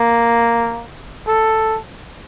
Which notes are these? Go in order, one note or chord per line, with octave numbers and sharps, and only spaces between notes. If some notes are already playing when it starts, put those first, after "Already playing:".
Already playing: A#3
A4